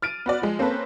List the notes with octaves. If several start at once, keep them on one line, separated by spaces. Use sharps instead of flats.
F6 A6 D7 D#7
B3 F#4 D5
F3 G#3
A#3 C4 C#4 A4 B4